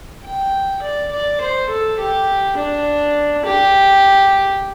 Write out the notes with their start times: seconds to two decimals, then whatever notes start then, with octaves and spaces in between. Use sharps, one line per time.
0.24 G5
0.82 D5
1.11 D5
1.41 C5
1.70 A4
1.99 G4
2.57 D4
3.45 G4